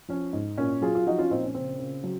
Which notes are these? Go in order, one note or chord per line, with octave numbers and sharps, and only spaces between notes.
F3 C#4
G#2
A#2 C#4
F#3 F4 G#4
F4
F3 D#4 F#4
C#4 F4
A#2 C4 D#4
C#4
C#3 C4
C#3
F#3